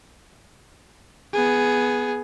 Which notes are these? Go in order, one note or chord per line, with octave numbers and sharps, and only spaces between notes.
B3 G#4